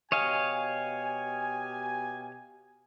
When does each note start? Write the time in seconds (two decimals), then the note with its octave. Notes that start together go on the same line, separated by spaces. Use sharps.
0.12 B2 G4 C#5 D#5 F5 G#5